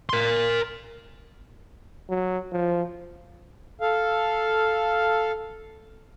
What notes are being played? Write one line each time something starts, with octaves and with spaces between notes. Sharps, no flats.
A#4 C6
F#3
F3
A4 F5